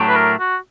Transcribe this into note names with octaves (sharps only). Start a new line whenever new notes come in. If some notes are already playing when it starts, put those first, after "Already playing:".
Already playing: A2 F#3 A3 D4 G4
B4
A#4
F#4